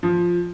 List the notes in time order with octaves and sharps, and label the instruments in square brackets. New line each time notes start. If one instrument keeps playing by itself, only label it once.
[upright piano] F3